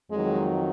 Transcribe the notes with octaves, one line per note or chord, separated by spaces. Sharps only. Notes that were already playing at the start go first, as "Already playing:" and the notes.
F2 D#3 F#3 G#3